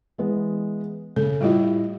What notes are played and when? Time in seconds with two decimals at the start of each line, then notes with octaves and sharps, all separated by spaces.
0.18 E3 G#3 B3
1.16 C#3 A4
1.41 A2 G3 E4 F4 G4 D#5